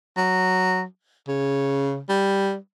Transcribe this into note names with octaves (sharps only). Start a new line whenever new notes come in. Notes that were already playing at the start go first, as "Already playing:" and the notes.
F#3
C#3
G3